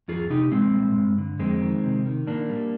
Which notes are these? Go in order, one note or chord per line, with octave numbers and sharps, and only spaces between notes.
F2 F4 G#4
C3 D#4 G4
A#2 G#3 C4
G3
G2
D3
F2 G#3 C4
D#3
C3
D#3
A#2 A#3 D4
G3